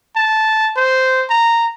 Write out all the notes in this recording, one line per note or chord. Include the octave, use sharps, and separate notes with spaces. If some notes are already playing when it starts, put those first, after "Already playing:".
A5
C5
A#5